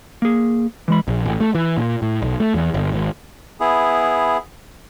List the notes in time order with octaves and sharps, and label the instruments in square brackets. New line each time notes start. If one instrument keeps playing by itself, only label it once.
[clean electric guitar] A#3 G#4
E3 G#3 B5
[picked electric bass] A#1
A1
A3
E3
A#2
A2
B1
A3
E2
G1
G#1
[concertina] B3 E4 G#4